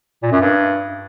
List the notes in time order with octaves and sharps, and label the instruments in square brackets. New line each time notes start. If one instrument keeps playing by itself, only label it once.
[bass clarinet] A#2
F#2
G2